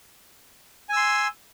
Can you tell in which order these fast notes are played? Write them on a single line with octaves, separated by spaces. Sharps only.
G#5 E6 C6